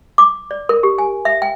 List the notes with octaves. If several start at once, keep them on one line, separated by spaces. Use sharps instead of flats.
D6
D5
A#4
G4
G#5
E5
G5